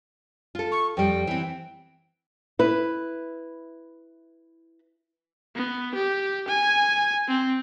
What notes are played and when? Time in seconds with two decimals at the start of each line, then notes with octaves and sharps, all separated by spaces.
0.55 F4 A4
0.72 C#6
0.97 F2 G3 G5
1.27 E3 C4
2.59 E4 B4
5.56 B3
5.95 G4
6.48 G#5
7.28 C4